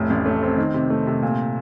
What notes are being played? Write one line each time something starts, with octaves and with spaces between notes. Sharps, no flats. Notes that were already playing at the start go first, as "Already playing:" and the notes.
Already playing: F1 A2
A1
A3
C4
D#3
C3
A3
C3
A#2